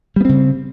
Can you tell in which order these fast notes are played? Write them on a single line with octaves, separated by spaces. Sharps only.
G3 B3 C4 C#3